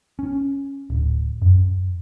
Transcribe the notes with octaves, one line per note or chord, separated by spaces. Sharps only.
C#4
D1
F#2